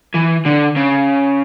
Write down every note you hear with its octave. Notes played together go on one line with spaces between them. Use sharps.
E3
D3
C#3